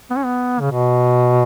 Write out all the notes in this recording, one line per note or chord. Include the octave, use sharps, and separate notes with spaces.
B3
C#4
B3
C#3
B2